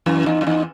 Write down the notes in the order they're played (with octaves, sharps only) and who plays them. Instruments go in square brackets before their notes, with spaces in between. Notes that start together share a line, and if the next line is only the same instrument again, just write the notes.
[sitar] F#2 [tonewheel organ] E3
[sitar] E2 [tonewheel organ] D#4
[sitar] F#2
[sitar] E2 [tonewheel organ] D#4